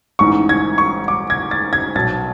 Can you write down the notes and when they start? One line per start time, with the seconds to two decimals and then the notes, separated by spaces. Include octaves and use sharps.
0.19 A1 G#2 E3 C#6
0.49 G#6
0.78 C#6
1.08 D6
1.30 G#6
1.51 A6
1.73 G#6
1.95 B1 B2 A6